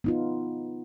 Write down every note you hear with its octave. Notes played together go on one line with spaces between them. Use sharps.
B3 D#4 F4